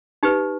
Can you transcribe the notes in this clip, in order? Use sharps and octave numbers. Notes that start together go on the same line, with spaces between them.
D#4 G4 B4